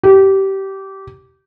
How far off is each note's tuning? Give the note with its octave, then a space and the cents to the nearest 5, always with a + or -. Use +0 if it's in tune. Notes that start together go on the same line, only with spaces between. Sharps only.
G4 -20